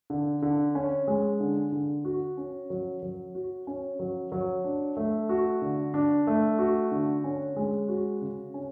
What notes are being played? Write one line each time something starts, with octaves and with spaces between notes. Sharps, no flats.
D3
D3
C#4
G#3
D3
D3
F#4
C#4
F#3
F#3
F#4
C#4
F#3
F#3
D4
A3
F#4
D3
D4
A3
F#4
D3
C#4
G#3
F#4
C#3
C#4